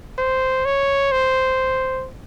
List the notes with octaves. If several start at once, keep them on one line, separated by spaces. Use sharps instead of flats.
C5
C#5
C5